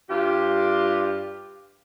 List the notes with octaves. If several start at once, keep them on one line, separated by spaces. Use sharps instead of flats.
G2 F4 G4